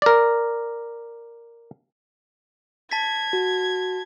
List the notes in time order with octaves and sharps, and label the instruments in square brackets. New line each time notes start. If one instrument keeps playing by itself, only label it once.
[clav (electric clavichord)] A#4 D5
[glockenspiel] A5 A6 B6 [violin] G#6
[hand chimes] F#4